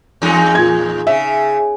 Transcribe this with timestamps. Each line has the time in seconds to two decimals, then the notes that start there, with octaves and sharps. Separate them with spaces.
0.22 E2 G#3 D#4
0.55 A#2 G#6
1.07 C#3 E5